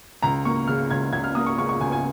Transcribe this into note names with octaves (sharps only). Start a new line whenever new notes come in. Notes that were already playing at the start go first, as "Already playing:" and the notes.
C#2 A#5
A#3 C#6
C#3 F6
C#2 G#6
C#2 G#6
F6
A#3 D#6
C#6
C#3 C#6
C#6
C#2 G#5
G#5